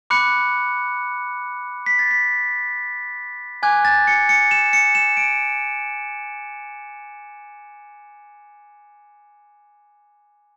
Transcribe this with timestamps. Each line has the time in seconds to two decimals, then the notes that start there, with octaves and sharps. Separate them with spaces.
0.10 B5 D6 F#6 C#7
1.86 B6
1.99 A6
2.11 B6
3.63 G#5 D6 F#6 G#6
3.85 A6
4.07 C#7
4.29 C#7
4.51 E7
4.73 C#7
4.95 E7
5.17 D7